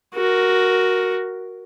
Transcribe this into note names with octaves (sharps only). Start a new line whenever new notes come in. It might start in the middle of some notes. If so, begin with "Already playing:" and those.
F#4 A#4